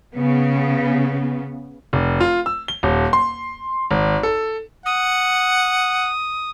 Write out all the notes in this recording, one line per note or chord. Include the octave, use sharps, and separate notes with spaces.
C#3 B3
F1
F4
E6
G7
D#1
C6
G#1
A4
F#5 D#6